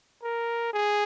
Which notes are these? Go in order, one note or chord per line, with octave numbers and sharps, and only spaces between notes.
A#4
G#4